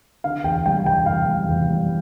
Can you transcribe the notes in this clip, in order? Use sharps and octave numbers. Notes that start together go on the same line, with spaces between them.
D3 F5
E2 G5
G3 G5
E2 G5
E2 F5
G3
E2
G3